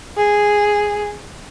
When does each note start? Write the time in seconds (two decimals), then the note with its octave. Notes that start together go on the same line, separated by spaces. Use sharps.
0.17 G#4